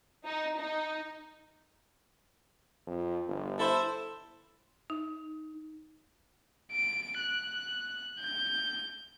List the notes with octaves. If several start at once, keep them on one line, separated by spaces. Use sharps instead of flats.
D#4
D#4
F2
G1
E4 A4 C5
D#4
D7
F#6
G6